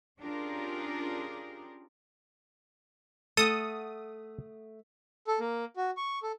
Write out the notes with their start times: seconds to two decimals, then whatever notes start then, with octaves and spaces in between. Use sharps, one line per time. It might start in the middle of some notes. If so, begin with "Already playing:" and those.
0.19 C#4 D4 F4 G4 G#4 A#4
3.37 A3 A4 F#5 D#6
5.27 A4
5.40 A#3
5.77 F#4
5.97 C#6
6.23 A4